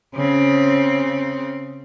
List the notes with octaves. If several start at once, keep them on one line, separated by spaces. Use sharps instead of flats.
C#3 C4